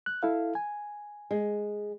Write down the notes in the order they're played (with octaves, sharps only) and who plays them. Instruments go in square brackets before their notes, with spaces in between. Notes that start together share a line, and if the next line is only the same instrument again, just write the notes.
[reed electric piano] F#6
E4 A4 F5
G#5
[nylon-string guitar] G#3